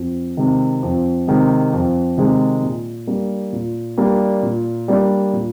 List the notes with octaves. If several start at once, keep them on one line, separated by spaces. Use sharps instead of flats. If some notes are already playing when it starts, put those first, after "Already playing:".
Already playing: F2
C3 D#3 G#3
F2
C3 D#3 G#3
F2
C3 D#3 G#3
A#2
G3 A#3 D4
A#2
G3 A#3 D4
A#2
G3 A#3 D4
A#2